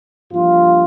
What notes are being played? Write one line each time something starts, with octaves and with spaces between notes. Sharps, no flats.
G2 F3 A#3 F4